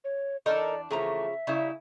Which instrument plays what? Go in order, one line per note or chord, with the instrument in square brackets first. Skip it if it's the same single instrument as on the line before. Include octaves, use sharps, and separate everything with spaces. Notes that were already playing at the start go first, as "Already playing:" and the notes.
[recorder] C#5
[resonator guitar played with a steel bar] E2 D4 [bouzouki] D#4 A4 A#4 [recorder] D5
[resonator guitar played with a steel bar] E2 A3 A#5 [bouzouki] C#3 F3 [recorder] E5
[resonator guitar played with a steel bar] C#3 E4 [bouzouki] G3 D#4